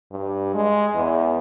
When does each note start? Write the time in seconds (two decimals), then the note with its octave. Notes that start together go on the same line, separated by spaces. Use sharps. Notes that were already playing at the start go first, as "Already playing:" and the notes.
0.12 G2
0.55 G#3
0.95 E2